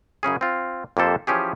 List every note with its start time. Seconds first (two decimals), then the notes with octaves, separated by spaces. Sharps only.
0.23 F#2 C#3 C#4 G#4
0.41 C4 F4
0.97 F2 A#3 G4 A4 C5
1.27 E3 F3 C#4 G4 G#4